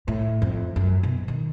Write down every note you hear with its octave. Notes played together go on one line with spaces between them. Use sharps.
A2
F2
F#2
B2
D#3